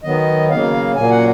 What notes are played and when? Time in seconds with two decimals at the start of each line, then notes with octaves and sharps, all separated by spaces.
0.03 D#3 F#3 B3 D#5
0.50 C#3 F#3 A#3 F5
0.96 A#2 F#3 A#3 G#5
1.11 F#5